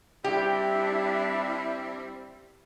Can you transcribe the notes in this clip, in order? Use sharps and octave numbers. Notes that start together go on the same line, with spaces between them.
G3 C4 D4 E4 G4 E5